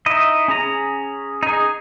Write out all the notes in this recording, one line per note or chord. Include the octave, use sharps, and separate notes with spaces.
D#4 E4 D#5
C#4 G#4 A#5
D#4 G#4